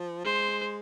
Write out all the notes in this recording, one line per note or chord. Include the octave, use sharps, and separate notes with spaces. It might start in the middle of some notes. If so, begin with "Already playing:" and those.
Already playing: F3
G#3 C5